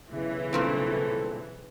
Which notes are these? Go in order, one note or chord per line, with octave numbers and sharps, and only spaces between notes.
B1 C#3 E3 E4
G2 A#2 C4 A4